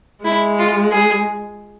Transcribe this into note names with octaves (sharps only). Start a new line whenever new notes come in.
G#3 E4
F4
G#4